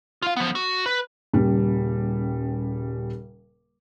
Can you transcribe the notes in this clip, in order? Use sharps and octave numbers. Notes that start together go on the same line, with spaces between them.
F4 F5
F3 B3
F#4
B4
D#1 C#3 G3